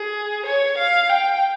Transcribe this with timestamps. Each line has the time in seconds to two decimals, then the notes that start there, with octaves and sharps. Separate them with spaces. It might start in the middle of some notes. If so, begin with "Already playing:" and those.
Already playing: G#4
0.46 C#5
0.78 F5
1.10 G5